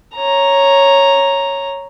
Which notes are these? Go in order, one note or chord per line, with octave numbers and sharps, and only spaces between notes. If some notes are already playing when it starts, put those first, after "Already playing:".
C#5 A#5